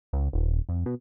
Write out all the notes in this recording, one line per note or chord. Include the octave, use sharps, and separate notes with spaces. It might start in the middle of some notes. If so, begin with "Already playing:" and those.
C#2
D#1
F2
B2